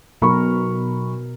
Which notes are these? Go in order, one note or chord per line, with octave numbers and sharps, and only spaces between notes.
B1 B2 A#4 B5 C#6